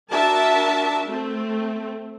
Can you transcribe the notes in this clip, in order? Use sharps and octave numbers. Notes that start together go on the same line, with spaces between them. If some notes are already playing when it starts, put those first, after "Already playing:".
D4 F#4 A#4 E5 A5
A3 C4